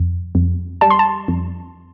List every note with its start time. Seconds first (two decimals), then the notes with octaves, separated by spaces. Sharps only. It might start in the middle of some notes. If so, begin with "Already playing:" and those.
Already playing: F2
0.35 F2
0.81 G3 A5
0.90 C6
0.99 A5
1.28 F2